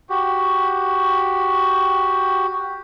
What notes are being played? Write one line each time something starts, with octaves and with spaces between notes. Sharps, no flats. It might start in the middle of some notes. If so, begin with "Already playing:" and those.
F#4 G4